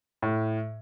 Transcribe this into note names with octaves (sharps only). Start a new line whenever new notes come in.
A2